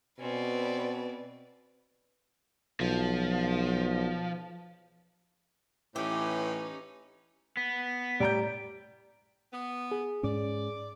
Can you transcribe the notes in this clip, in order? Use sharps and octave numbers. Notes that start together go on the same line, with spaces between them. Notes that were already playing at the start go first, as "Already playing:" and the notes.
B2 C4 C#4 B4 D5
B1 F3
A2 E3 C#4 D#4 G4
B3 B6
B6
A2 G3 A#5 G6 D7
B3
G#4
G#2 C#4 D5